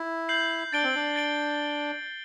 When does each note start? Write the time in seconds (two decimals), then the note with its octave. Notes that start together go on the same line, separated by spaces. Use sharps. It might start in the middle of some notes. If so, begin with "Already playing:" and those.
Already playing: E4
0.29 G6 C7 F#7
0.73 D4 A6 D7 G7
0.84 C4
0.95 D4
1.16 A6 D7 G7